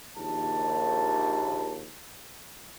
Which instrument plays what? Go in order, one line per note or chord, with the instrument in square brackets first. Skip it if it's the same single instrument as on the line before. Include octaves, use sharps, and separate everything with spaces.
[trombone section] A#1 D#2 [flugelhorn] A5